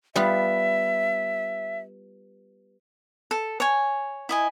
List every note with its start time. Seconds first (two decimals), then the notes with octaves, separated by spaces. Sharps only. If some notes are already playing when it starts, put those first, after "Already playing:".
0.16 G3 B3 F4 E5
3.31 A4
3.60 C#5 G#5
4.29 E4 D#5 G#5